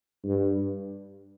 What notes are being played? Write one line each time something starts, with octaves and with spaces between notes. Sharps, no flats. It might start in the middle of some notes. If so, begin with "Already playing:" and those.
G2